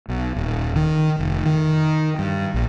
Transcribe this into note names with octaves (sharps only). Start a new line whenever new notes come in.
B1
D#1
D#3
F1
D#3
G2
A#1